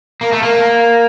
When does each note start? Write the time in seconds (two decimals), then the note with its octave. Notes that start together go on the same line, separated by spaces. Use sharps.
0.21 A#3
0.32 A3
0.43 A#3